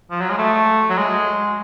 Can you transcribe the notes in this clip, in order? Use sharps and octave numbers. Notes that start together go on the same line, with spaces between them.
F3
F#3
G#3
A3
F#3
G#3